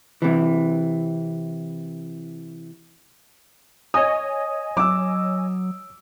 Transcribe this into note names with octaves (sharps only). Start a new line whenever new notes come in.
C3 E3
C#5 D#5 G#5 D#6
F#3 D6 E6